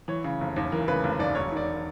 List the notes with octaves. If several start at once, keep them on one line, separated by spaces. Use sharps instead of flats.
E3 C#5
C#3
F1
D#2
E3 A#4
C#3 B4
F1
D#2 D5
E1 C#5
D#3 D5